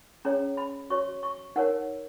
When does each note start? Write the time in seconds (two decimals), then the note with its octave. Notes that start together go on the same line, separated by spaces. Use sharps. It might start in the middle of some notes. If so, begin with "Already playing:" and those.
0.25 C#4 G#4 C#5 A#5
0.57 B5
0.90 F#4 C#5 C#6
1.23 C#6
1.56 D#4 A#4 C#5 F#5